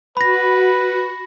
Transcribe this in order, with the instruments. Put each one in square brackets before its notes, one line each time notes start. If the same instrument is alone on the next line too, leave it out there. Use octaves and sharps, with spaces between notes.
[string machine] F#4 [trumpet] B4 [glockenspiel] B5 A#6